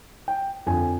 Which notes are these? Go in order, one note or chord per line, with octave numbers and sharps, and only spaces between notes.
G5
F2 D3 F3 G#5